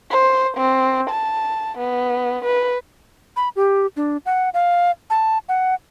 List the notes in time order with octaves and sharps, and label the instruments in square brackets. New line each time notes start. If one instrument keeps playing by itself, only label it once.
[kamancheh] C5
C4
A5
B3
B4
[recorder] B5
G4
D4
F#5
F5
A5
F#5